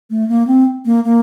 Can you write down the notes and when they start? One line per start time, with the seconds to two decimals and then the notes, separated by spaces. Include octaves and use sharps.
0.10 A3
0.28 A#3
0.47 C4
0.85 A#3
1.04 A#3